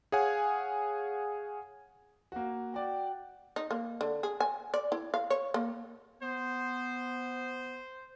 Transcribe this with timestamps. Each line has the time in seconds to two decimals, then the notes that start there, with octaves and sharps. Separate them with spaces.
0.12 G#4 C#5 F5 F#5 G#5
2.32 A#3 F#4
2.74 F#4 D5 G5
3.56 D#4
3.71 A#3
4.01 D3
4.23 G#4
4.40 G#5
4.74 D5
4.92 E4
5.14 F5
5.30 C#5
5.54 A#3
6.22 B3 C5